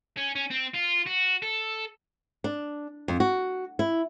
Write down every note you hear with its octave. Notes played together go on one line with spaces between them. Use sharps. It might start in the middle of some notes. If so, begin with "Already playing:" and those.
C#4
C#4
C4
F4
F#4
A4
D4
F2
F#4
E4